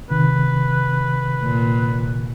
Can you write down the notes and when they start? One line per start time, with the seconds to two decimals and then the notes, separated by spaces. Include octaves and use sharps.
0.10 C3 D#3 B4
1.43 A#2